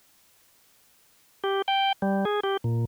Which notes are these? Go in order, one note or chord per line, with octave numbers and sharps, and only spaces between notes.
G4
G5
G3
G#4
G4
A#2